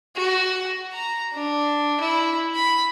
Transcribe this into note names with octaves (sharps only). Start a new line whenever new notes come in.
F#4
A#5
D4
E4
B5